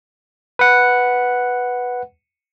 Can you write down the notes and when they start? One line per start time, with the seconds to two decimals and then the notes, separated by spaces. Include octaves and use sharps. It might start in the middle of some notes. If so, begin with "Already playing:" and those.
0.59 B4 F#5